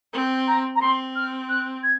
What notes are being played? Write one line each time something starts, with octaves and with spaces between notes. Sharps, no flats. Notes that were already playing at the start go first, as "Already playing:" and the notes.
C4
A#5
A#5
C4 C6
F6
F#6
G#6